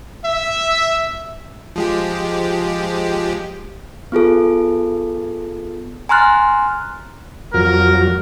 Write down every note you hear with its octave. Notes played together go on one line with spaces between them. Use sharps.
E5
F3 G#3 G4
B3 F4 G#4 A4
G#5 A#5 C6 F6 F#6 A6
F2 F#3 A#4